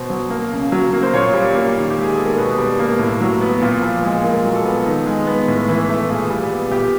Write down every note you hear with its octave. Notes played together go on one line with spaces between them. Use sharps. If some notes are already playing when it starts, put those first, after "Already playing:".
Already playing: B2 C5
F#3
A#3
C#3
F#3
A#3
C5
A#2 C#5
G3
A#3
D#3
G4
G#3
G#4
B3 A4
A#4
B2 B4
G3
A#3
A2
F#3
B3
A#2
F3
G#3
A#2 A#4
F#3
A4
B3
D#3
G#3
B3
A2
E3
A3
A#2 G#4
G3
B3
A#2 G4